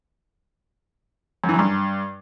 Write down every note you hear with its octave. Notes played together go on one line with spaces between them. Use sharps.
F#2
E3
F#2
G2